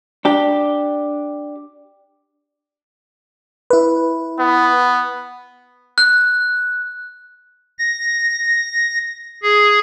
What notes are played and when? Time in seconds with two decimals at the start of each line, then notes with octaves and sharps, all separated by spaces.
0.25 D4 G4
3.70 E4 B4
4.39 B3
5.98 F#6
7.79 A#6
9.43 G#4